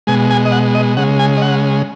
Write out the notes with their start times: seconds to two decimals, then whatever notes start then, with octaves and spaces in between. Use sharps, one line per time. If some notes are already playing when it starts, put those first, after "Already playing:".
0.07 B2 G#3 G#5
0.30 G#5
0.45 D#5
0.52 F#5
0.75 D#5
0.97 C#3 G#3 F#5
1.19 G#5
1.37 D#5
1.42 F#5